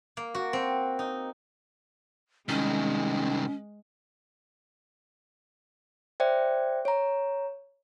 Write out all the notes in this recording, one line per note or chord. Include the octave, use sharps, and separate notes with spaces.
A#3
F#4
C4
D#4
C2 D#3 G#3 C#4
C5 D5 E5 G5
C#5 A#5